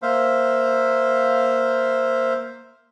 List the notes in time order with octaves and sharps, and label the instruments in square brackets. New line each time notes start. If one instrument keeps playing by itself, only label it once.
[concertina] A#3 C5 E5 F5